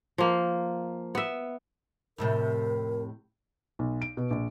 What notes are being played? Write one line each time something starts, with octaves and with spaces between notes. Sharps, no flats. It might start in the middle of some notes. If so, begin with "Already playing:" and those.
F3 A#3
B3 E5
F2 A2 C3 A#4
B1
D7
B2
A#1